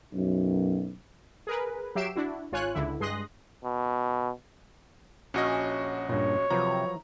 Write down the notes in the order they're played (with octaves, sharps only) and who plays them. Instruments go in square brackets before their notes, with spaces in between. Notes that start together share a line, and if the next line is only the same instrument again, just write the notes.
[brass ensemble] B1 F#2
[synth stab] G#4 A#4 B4
F#3 G4 E5 C7 D7 E7
D4 E4 F#4
G#1 F4 C#5 G#5 F#6
C#2 D3 E4
G2 G#3 C6 D#6 F#6 A#6
[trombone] B2
[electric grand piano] A#1 F#4 D#5 [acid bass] C#4
[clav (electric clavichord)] G2 A#2 [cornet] C#5
[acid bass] C3 [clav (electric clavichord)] F3 F#3 B4 [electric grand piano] A#5